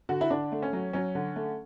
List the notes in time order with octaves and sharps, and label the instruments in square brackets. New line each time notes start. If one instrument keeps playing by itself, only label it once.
[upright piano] D3 F#4
E4
D3 D4
A3
C#4
F#3
F#3 C#4
D3
A3